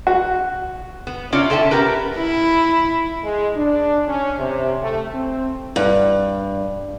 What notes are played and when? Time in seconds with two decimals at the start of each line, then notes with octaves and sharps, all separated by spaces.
0.07 F#4
1.07 B3
1.32 C3 C#4 F4 C#5 D5
1.50 D3 A4 E5 G5 A5
1.71 B3 C#4 G4 A#4 B4
2.17 E4
3.24 G#3
3.56 D4
4.07 C#4
4.38 C3
4.82 A3
5.14 C4
5.76 G2